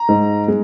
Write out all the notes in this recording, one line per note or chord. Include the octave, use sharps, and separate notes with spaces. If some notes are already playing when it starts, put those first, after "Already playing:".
Already playing: A#5
G#2
G#3